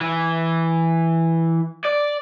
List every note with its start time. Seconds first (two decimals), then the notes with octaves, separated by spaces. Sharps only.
0.01 E3
1.84 D5